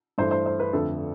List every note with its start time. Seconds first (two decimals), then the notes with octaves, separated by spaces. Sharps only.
0.18 G2 E3 A3 C5
0.31 C5
0.46 C5
0.60 B4
0.73 F2 D3 A3 A4